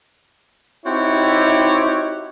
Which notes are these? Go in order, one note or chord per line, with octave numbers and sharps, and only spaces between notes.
C4 D#4 E4 F#4 G4 C#5